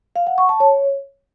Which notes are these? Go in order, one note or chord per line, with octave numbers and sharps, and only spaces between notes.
F5
F#5
C#6
A5
C#5